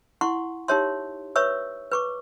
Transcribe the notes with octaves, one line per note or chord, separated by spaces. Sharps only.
E4 F#5 C6 C#6
D#4 G4 A#4 C#5 E5 C6
B4 C#5 E5 C#6 E6
B4 C#6 D6